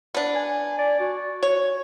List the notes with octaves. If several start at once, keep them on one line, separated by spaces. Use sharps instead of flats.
B3 D4
G#5
D5
F#4
C#5